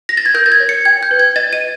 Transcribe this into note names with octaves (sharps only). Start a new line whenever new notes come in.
A#6
A6
G#6
A#4 G6
A6
G#6
C#5
C#7
G5 G#6
G6
B4
G#6
D#5 A6
D#7